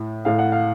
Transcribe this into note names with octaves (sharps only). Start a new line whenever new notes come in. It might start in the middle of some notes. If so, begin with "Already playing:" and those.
Already playing: A2
A2 F5
F#5
F5